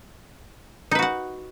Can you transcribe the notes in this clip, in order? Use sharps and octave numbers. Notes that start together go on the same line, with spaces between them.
D#4 F#4 B4 F#5